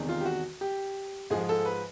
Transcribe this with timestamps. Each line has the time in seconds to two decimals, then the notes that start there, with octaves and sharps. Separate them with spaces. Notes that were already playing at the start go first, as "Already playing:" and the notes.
Already playing: E2 C3 D#3 G#3
0.09 F4
0.21 G4
0.26 F#4
0.61 G4
1.30 G#2 F3 G#3 G#4
1.41 G#4
1.49 A4
1.66 B4